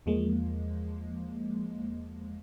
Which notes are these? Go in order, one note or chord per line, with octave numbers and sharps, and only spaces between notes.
E2 F3 G#3 A#3